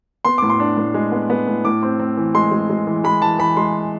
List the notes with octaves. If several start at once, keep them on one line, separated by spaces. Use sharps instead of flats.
B3 C6
A2 D6
C6
D4
A2
G#3
B3
B3
A2
A2 D6
C4
C4
E3
G#3 C6
G#3
G#3
E3
G#3 B5
E3 A5
E3 B5
G#3 C6